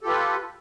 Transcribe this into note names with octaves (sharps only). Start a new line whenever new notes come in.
F4 G4 A4 B4